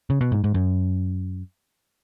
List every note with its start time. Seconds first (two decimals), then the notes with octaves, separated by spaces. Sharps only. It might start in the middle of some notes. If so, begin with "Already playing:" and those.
0.10 C#3
0.21 B2
0.32 G#2
0.44 G#2
0.54 F#2